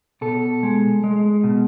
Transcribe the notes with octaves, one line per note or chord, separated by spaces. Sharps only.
B2 A4
G#3
G#3
B2